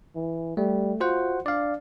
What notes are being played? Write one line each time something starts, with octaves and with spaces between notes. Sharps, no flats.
E3
G3 A3
F4 F#4 C5 F#5
D4 D5 F5